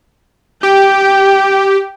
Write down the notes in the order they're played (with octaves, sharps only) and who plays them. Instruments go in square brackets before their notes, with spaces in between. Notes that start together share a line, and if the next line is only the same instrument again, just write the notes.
[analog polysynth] G4 [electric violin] G5